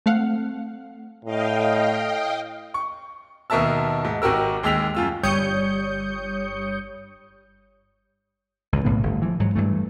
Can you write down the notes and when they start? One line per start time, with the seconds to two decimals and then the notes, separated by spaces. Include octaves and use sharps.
0.06 A3 C4 F5 F#5
1.25 A2 D#5 F5 G5
2.74 C#6
3.50 D#2 B2 A#4 E5 A5 E6
4.05 G#2
4.22 G#1 F#4 G4 A#4 E6
4.63 D#2 G#3 G5 E6 B6 F7
4.95 F#2 F4 E6
5.23 G1 G3 C#5 D#6 G6 C#7
8.73 C#2 G#2
8.85 B1 A2 C#3 B3
9.03 G1 A3
9.22 E3 F3
9.40 G#2 F#3
9.55 G2 E3 A3